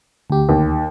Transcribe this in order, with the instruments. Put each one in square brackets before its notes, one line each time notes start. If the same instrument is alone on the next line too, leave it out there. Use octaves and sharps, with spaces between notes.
[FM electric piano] D2 G4
[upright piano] D#2